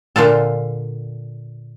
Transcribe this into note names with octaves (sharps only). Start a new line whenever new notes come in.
A#2 D3 F4 A4